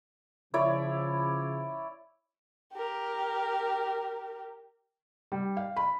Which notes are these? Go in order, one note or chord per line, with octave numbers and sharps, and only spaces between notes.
C#3 F3 E4 C#5 D5
G4 A#4
G3
F5
B5